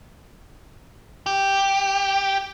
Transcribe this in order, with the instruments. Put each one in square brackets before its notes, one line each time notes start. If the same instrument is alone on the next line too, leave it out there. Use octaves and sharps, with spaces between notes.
[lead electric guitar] G4